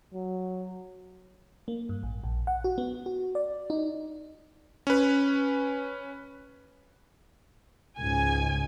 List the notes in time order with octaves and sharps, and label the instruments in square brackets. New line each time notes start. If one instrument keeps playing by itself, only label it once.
[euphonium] F#3
[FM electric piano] A#3
G2
A1
A#1
F#5
F#4
B3
F#4
D5
D#4
[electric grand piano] C#4 B4
[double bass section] C#2 G#2 [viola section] G#5